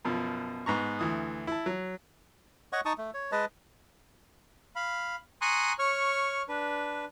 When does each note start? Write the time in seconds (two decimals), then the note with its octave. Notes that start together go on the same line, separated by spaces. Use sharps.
0.05 F#2 B2 F3
0.66 G#2 B3 A#5 C#6
0.99 D2 E3 D#6
1.47 E4 A5
1.66 F#3
2.73 C#5 D#5 F#5 C#6
2.85 D#4 A5 C#6 D#6
2.98 A3
3.14 C#5
3.32 G#3 B4 D#5 A5
4.76 F5 B5
5.41 G#5 A#5 C6 C#6 D#6 F#6
5.79 C#5 C#6 F6
6.49 D4 B4